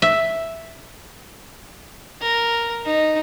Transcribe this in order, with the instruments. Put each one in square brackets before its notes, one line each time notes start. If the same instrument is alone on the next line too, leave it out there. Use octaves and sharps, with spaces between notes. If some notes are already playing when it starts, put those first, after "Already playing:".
[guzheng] E5
[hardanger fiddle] A#4
D#4